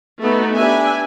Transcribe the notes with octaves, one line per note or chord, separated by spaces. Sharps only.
A3 B3 D#4 F#4
D4 G4 B4 E5 G#5